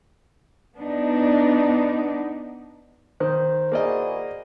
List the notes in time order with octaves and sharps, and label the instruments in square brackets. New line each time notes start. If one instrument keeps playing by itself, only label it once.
[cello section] B3 D4 D#4
[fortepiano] D#3 [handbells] C5
[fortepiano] A#3 D5 D#5 [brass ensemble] E4 F#4 G#4